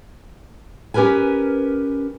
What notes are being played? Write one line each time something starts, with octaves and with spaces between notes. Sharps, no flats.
C#4 G4 A#4 B4 G#5